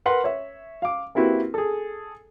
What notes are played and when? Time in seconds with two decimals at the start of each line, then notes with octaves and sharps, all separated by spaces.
0.06 A#4 B4 F#5 C6
0.24 C#5 E5
0.82 F5 D6
1.15 A#3 C4 E4 F#4 G4 B4
1.54 G#4 A4